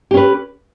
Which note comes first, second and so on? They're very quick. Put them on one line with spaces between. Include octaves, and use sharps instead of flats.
G4 C#4 B4